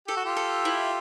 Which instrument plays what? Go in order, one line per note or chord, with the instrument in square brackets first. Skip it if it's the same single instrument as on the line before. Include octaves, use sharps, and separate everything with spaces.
[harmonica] G4 [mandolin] A4
[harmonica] F#4
F4 G4
[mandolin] A4
E4